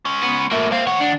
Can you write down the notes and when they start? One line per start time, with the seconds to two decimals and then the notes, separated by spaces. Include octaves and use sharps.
0.05 G#3 C#4
0.23 B3
0.51 A2 A#3 F#4 E5
0.72 A#3 C4 F5
0.87 D#3 C#5 F#5
1.00 D4